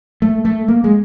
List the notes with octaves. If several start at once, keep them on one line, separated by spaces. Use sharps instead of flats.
A3
A3
A#3
G#3